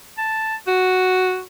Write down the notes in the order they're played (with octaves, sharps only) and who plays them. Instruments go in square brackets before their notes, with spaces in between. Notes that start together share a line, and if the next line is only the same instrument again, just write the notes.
[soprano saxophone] A5
F#4